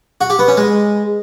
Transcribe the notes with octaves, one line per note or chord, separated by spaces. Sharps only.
F#4
G4
B3
C#4
G#3